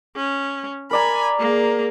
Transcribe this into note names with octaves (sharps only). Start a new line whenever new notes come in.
C#4
A#4 D5 G#5 A#5 B5
A#3 G#4